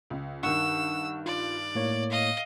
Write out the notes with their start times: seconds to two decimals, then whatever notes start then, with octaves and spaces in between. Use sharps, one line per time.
0.10 C#2
0.43 G2 D#3 F#5 C#6 E6
1.26 F4 D5
1.75 A2 A#3 C#5
2.10 D#5 F5